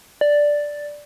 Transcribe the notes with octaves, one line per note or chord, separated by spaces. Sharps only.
D5